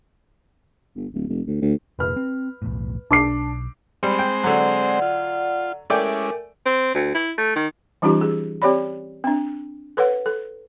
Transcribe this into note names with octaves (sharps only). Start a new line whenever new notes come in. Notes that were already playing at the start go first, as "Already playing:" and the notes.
G1
D1
F1
D2
D2
F1 A#2 B4 F6
C4
B1 E2 A2
B1 D4 D6 C7
G3 G#3 C4 C5 B5
G5
D3 F#3 D5 F#5
F4
G#3 A3 C#4 E4 A#4 D5 G5 G#5
C4
D2
E4
A3
D#3
E3 G3 C#4 D#4 F4 G4
G#4
C4 G4 C#5 D5 B5
C4 D4
A4 B4 C#5 F#5
A4